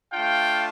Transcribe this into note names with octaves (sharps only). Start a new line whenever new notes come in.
A3 D4 F4 F5 G5